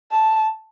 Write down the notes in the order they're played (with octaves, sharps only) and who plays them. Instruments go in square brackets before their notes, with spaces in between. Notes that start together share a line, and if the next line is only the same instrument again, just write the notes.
[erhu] A5